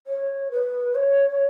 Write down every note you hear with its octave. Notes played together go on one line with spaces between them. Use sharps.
C#5
B4
C#5